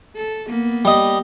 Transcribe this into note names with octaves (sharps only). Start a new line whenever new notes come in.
A4
A#3 B3
G3 D#5